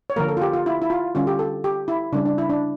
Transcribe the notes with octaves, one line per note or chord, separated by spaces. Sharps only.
C#5
D3 F3 A#3 A#4
A4
F4
G4
F4
E4
E4
F4
D3 G3 C#4 F4
G4
A4
G4
E4
C#3 G3 C#4 D4
D4
E4
D4